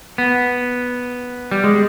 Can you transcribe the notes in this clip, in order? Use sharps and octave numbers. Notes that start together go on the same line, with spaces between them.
B3
G3
G#3